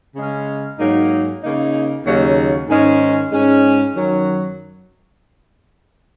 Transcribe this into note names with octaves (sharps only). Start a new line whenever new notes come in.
C#3 G#3 C#4
G#2 F#3 A#3 D#4
C#3 A#3 D#4
D#2 C#3 F#3 A#3 D#4
G#2 D#3 G#3 C#4
G#2 G#3 C#4
F#2 D#3 F#3